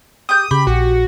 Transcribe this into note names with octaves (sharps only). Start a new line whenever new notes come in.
G4 D#6 G6
C#3 G4 B5
A#1 F#4